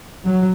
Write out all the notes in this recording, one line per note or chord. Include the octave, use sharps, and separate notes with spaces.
F#3